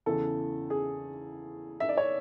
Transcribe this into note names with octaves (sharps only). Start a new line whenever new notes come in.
E2 C#3 E3 A4
G#4
E5
D5
C#5